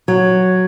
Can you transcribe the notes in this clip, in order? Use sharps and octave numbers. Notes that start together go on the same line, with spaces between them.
F#3